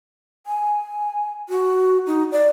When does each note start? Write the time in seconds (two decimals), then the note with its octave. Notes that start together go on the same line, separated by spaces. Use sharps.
0.47 G#5
1.49 F#4
2.07 D#4
2.32 D5